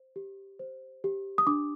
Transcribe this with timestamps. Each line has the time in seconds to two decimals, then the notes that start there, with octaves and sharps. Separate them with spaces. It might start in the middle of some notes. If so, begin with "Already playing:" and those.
Already playing: C5
0.16 G4
0.59 C5
1.04 G4
1.38 D#6
1.47 D4 D6